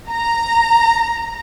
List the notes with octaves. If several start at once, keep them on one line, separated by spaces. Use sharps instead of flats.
A#5